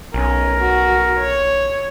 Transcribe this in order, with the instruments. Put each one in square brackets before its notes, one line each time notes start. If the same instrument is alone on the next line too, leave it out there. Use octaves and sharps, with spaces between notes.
[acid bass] B1 [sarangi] C#4 [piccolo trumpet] A#4
[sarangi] F#4
C#5